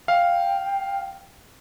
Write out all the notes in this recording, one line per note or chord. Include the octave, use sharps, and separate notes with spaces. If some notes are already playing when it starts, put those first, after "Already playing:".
F5 G5